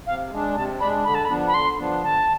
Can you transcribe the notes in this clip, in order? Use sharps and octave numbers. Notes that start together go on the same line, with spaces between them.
C3 F5
G#3 D4
C3 A5
G#3 D4 B5
D3 B5
A5
B5
F3 B3 D4
B5
D3 C6
F3 B3 D4
D3 A5